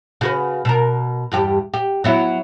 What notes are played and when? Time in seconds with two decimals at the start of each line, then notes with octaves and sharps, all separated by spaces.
0.21 C#3 F#4 B4
0.65 B2 A#4
1.32 E2 G2 G4
1.74 G4
2.04 F#3 B3 E4